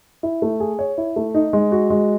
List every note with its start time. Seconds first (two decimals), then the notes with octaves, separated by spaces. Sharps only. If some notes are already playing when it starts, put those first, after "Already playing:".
0.23 E4
0.42 A3
0.60 G#4
0.79 C#5
0.98 E4
1.16 A3
1.34 D#4
1.53 G#3
1.72 F#4
1.90 G#3